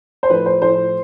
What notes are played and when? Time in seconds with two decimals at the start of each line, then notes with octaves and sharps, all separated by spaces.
0.23 C5
0.30 A2 F3 A3 B4
0.46 C5
0.62 A2 F3 A3 C5